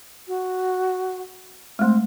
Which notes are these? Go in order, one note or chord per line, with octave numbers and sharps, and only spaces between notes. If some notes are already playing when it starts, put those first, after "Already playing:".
F#4
G#3 A3 C4